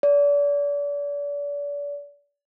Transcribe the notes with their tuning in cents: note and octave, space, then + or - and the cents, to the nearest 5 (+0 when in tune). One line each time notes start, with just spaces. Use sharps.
D5 -35